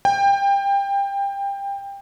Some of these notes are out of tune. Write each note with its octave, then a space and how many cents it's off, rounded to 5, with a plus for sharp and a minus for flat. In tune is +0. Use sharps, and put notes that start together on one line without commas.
G5 +25